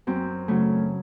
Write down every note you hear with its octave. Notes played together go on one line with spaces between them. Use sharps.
F#2 C4
C#3 F#3 A3